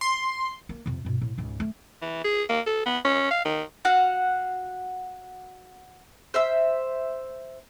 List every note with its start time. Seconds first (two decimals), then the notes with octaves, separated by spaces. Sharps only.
0.01 C6
0.69 A#3
0.86 F2 C3
1.05 G2 B2
1.21 A2
1.38 C#2 G#2
1.60 A3
2.02 E3
2.24 G#4
2.49 A#3
2.67 A4
2.86 B3
3.05 C#4
3.31 F5
3.45 D#3
3.85 F#4 F5 F#5
6.34 C5 E5 E6